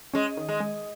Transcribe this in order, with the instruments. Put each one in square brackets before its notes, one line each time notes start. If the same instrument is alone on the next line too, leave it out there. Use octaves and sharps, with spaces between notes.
[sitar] G#3 [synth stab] C#4
[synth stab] D#3
[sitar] G#3
[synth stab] G#3